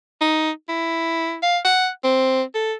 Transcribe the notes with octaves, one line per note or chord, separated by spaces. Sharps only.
D#4
E4
F5
F#5
C4
A4